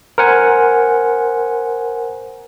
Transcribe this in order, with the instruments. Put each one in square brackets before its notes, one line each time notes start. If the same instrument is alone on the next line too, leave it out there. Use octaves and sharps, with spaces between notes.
[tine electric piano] A#4 C5 F#5 G#5